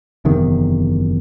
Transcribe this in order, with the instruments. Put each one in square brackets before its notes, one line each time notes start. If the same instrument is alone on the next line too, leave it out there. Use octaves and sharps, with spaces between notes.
[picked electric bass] F#1 E2 C3 D#3